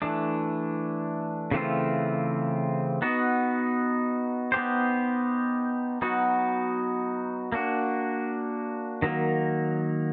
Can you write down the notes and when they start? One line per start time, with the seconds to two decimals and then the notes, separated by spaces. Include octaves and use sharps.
0.02 E3 A3 D4
1.51 C#3 E3 A3 C4 F4
3.02 B3 D#4 F#4
4.52 B3 D#4 G4 C5
6.02 F#3 B3 D#4 F#4
7.52 A#3 D4 F#4
9.02 D#3 F#3 A#3